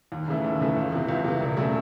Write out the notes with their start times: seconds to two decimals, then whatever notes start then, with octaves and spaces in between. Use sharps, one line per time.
0.12 D#2
0.28 C#3 E3 A3
0.44 D#2
0.60 C#3 E3 A3
0.77 C#2
0.92 C3 E3
1.09 C#2
1.24 C3 E3
1.40 E1
1.57 C#3 F#3 A3